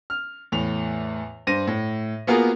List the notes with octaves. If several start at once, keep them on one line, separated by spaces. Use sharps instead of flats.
F6
E2 A2 F7
G2 C5 A#6 D#7
A2
A#3 B3 F4 F#4 G#4 A#4